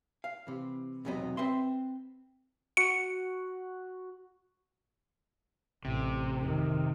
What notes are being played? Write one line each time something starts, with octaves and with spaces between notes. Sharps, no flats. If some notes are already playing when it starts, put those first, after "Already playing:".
F5
C3 E3
B1 E2 C3 F#3 B3 D#5
C4 B4 E5 C6
F#4 C#7
A1 C3
F2 D#3